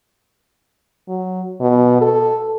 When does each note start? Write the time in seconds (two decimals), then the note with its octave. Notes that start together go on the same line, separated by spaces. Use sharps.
1.08 F#3
1.61 B2
2.02 A4